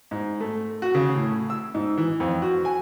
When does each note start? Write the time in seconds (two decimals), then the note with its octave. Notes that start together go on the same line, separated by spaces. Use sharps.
0.11 G#2
0.40 A3
0.82 F#4
0.95 C#3
1.15 A2
1.50 E6
1.74 G#2
1.98 E3
2.20 F2
2.42 F#4
2.65 G#5